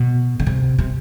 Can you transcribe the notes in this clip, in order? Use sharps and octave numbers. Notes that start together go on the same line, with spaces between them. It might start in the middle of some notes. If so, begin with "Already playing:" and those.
Already playing: B2
D3
C3
C3